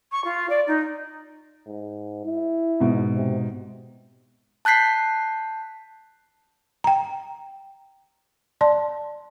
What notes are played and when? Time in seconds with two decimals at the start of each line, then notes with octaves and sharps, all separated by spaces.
0.12 C#6
0.24 F4
0.49 D5
0.67 D#4
1.66 G#2
2.25 E4
2.80 G#2 B2
3.16 C3
4.65 A5 F#6 G6 B6 C7
6.84 G5 A#5
8.61 D5 A5 C6